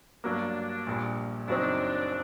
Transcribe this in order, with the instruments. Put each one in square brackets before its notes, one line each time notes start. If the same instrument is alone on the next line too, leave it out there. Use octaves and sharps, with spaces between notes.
[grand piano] G2 F#3 A#3 [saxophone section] D4
[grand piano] A#1 A#2 G3
[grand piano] F#1 F#2 F#3 C4 D#4 [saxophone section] D4